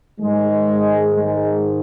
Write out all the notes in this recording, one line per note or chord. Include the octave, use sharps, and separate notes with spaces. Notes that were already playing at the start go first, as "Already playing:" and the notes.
G#2 D#3 G#3
G#3